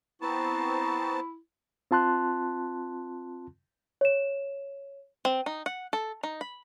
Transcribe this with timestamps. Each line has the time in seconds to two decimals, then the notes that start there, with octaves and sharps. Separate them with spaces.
0.22 B3 C4 E4 C5 A5 A#5 C#6
1.91 C4 F4 A5 C6 F#6
4.01 C#5 E7
5.25 C4
5.46 D#4
5.66 F#5
5.93 A4
6.23 D#4
6.41 B5